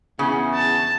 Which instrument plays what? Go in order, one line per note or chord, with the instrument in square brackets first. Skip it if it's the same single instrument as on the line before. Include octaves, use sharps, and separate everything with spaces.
[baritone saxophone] E2 [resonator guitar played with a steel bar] C#3
[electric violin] A5